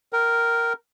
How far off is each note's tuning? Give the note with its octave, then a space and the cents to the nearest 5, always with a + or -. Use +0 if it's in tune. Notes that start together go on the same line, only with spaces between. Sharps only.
A#4 +0 G5 -30